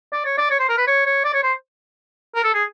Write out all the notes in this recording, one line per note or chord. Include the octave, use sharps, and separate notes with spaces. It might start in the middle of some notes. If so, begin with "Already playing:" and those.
D5
C#5
D5
C#5
C5
A#4
B4
C#5
C#5
D5
C#5
C5
A#4
A4
G#4